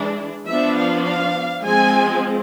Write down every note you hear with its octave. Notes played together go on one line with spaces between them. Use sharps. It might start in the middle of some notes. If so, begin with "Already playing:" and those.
Already playing: E3 G#3 D4
F3 B3 D4 E5
F5
F5
F3 G#3 C4 G#5